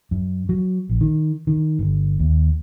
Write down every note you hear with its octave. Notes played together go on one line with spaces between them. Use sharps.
F#2
F#3
A#1
D#3
D#3
G1
D#2